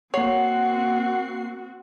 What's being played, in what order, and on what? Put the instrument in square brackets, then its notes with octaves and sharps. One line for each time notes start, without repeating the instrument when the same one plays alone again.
[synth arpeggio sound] A#3 C7 [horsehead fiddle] C4 F#4 [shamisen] C#5 [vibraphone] F#5